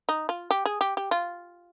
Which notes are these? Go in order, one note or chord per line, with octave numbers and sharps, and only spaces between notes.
D#4
F4
G4
G#4
G4
G4
F4